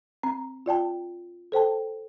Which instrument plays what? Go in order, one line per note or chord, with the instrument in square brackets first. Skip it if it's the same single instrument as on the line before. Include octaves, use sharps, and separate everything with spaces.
[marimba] C4 A#5
F4 D5 G5 A5
A4 C5 G5 A5